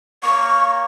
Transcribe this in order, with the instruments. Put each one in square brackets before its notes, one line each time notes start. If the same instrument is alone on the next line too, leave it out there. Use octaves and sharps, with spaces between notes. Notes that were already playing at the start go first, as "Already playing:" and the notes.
[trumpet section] A#3 C#5 [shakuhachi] C#6